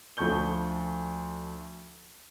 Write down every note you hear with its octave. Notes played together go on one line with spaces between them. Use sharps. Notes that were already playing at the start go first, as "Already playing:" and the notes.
D2 F3 A5 C#6 G6 G7